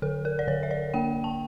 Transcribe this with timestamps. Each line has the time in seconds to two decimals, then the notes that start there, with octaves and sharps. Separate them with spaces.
0.02 D3 A4
0.25 A#4
0.39 D5
0.47 D3 C#5
0.63 E5
0.71 D5
0.94 A#3 G5
1.24 A5